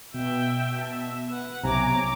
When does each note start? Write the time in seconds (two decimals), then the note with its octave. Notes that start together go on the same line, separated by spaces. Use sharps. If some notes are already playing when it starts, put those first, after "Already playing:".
0.14 B2 E5 G5
0.82 F#4 E5 A5
1.29 B4 F#5
1.64 B1 C3 C#5 G#5 A#5 D6